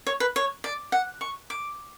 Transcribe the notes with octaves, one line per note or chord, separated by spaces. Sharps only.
C#5
B4
C#5
D5
F#5
C#6
D6